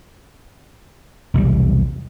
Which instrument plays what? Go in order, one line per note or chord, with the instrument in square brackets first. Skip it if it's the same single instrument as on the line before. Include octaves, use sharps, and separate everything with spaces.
[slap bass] B1 E2 C3 G3